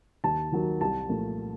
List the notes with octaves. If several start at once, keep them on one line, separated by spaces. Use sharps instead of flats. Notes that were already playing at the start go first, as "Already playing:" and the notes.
D#2 A5
D#3 F#3 A#3
C2 A5
A#2 F3 A3